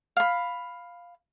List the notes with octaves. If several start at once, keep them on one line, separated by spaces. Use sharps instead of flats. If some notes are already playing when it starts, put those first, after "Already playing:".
F5 B5